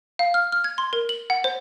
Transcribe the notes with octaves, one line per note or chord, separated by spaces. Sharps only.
F5
F6
F6
G#6
C6
A#4
F#7
F#5
C5